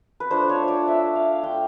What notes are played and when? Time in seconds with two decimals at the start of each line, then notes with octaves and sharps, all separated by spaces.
0.20 B4
0.30 A3 D4 F4 C5
0.49 C#5
0.68 D5
0.87 E5
1.15 F5
1.42 A3 D4 F4 G5